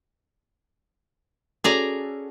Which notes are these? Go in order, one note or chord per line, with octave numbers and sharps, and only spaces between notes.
C#4 F#4 G#4 A4 D5 A#5